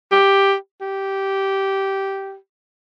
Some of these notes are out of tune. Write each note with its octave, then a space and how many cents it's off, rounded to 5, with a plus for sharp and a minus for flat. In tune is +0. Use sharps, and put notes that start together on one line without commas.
G4 +5
G4 -10